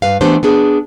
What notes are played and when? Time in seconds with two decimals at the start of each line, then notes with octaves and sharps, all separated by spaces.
0.02 G2 B4 F5
0.21 E3 A3 B3 D4 G4 C5
0.43 B3 D4 G#4